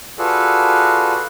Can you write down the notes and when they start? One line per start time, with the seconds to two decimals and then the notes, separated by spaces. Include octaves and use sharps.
0.18 F4 F#4 G#4 A4 B4 D5